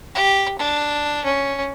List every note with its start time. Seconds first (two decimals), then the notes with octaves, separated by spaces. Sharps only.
0.15 G4
0.58 D4
1.24 C#4